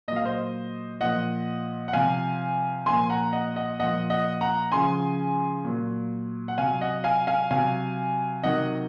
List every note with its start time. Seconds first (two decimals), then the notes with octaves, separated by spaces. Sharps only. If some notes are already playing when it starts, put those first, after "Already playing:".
0.08 A#2 D#5
0.12 F#3 F5
0.25 C5 D#5
1.01 A#2 F3 D#5 F#5
1.88 F#5
1.93 C3 F3 F5 G#5
2.86 A#2 F3 G#5 C6
3.10 F#5 A#5
3.33 D#5 F#5
3.56 D#5 F#5
3.80 A#2 F3 D#5 F#5
4.10 D#5 F#5
4.41 F#5 A#5
4.72 C#3 F3 G#5 C6
5.65 A#2 F#3
6.48 F#5
6.58 C3 F#3 F5 G#5
6.81 D#5 F#5
7.04 F5 G#5
7.27 F5 G#5
7.51 C3 F#3 F5 G#5
8.43 C3 D#3 F#3 D#5 F#5